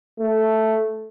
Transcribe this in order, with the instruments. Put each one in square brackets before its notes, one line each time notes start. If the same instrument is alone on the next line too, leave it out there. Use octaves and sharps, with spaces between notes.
[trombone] A3